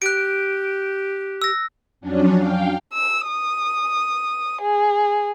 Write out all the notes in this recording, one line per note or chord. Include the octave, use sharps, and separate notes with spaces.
G4 F#6 D7
E6 A#6
F2 F#3 C#4 D4
F5 G5
E6
D#6
G#4